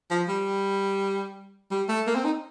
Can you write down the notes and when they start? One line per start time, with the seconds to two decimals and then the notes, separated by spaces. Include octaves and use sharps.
0.10 F3
0.28 G3
1.71 G3
1.89 A3
2.07 A#3
2.15 C4
2.24 D#4